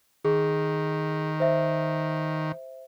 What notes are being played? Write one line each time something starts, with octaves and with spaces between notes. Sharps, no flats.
D#3 G#4
C5 E5